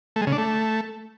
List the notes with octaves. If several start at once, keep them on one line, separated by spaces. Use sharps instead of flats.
A3
G#3
C#3
D4
A3